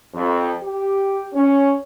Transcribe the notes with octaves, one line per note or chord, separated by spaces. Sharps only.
F2
G4
C#4